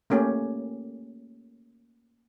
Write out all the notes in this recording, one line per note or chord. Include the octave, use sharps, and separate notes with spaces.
A3 A#3 C#4 G4